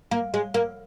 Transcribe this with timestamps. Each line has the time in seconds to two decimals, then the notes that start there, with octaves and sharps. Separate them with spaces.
0.11 A#3
0.34 G#3
0.54 A#3